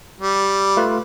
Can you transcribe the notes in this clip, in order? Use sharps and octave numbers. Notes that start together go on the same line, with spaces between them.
G3
A3 F4 B4